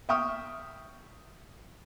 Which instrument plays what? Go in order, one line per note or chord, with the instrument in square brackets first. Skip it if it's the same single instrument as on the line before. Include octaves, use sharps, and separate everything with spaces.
[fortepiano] E5 G5 C#6 D#6 F6